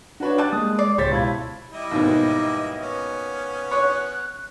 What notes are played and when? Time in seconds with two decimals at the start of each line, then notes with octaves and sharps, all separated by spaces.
0.20 D4 F#4 B4 C#5
0.38 G3 A5 F#6
0.53 G#3 A#3 D#6
0.79 D5 C7
0.98 C#2 A2 C#3 G4 C5 C#5 A6 B6
1.11 B2 E4 F4 A5 B5 G#6
1.73 G3 E4 D#5
1.91 D#2 G#2 B2
2.79 B3 C#4
3.71 C#5 F#6